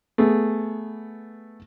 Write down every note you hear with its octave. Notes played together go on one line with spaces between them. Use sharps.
A3 B3 G#4